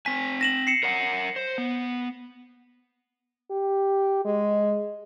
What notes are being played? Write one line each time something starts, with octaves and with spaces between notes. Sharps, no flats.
C4 G#5 B6
A#6 E7 F#7
C7 C#7 E7
A#4 C#5 F#5
C5
B3
G4
G#3